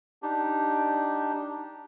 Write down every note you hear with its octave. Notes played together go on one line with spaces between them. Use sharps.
D4 D#4 G4